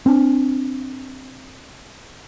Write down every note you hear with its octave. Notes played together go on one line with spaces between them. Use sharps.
C4 D4